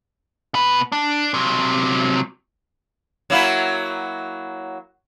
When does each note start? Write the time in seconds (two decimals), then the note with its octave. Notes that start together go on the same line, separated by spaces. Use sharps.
0.54 B2 B4
0.92 D4
1.34 C3 F#3
3.30 F#3 A#3 E4